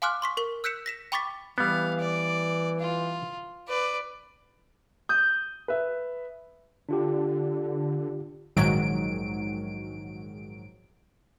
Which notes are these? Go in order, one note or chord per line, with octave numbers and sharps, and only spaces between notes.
F5 G#5 C6 D6 F6 F#6
C6 C#6 B6
A#4 C#6 G7
E6 F#6 G6 B6 C#7 E7
A#6 B6 E7
G5 B5 C#6 D6 A6 B6
E3 G3 B3 F5
D5
F4
B4 D5
D#6 G6
B4 E5
D3 D4 F4 G4
A#1 G#2 D#3 F#3 D7